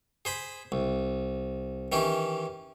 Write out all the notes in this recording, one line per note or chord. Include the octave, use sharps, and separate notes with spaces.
G#4 C5 B5
C2
D#3 E3 C#4 G4